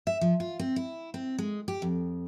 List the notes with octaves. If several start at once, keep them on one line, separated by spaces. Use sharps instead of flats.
E5
F3
F4
C4
E4
C4
G#3
G4
F2